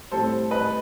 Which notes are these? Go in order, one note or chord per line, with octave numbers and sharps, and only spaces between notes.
A2 G3 C4 A4 C5
B4 D#5